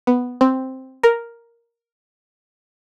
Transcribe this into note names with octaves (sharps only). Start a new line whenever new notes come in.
B3
C4
A#4